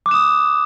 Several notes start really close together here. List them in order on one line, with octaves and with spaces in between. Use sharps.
D6 F#6 E7 D#6